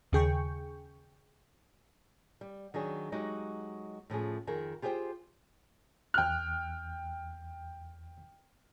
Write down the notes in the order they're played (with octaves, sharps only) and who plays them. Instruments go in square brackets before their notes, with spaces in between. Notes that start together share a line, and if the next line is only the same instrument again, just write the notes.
[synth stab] D#2 C#3 G#4 G5 C#6
[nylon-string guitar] G3
D#3 F#3 D4 G#4
F#3 G#3 D#4 F#4 G4
A2 F3 C#4 G#4
F2 D#3 G#4 A#4
F4 G4 G#4 B4 C5 G5
[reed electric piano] E2 F#6 [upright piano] G5 F6